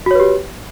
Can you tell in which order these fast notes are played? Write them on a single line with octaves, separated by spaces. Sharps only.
F#4 C#5 B4 G4